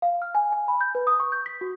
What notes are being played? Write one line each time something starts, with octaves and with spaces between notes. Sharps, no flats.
F5
F6
G#5
G#5
B5
G6
B4
D#6
C#6
G6
B6
F#4